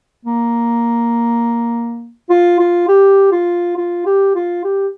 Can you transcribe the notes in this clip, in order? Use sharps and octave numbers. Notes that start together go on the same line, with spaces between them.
A#3
F4
F4
G4
F4
F4
G4
F4
G4